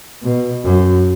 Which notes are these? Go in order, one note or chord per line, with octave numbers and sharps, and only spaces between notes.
B2
F#2